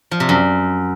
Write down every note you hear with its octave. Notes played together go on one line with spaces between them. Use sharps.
F3
C3
F#2